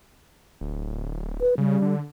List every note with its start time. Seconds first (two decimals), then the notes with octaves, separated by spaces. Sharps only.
0.61 D1
1.41 B4
1.58 C#3 G3
1.82 D3